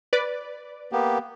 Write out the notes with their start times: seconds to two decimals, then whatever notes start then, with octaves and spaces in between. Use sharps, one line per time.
0.13 B4 D5
0.92 A#3 B3 G4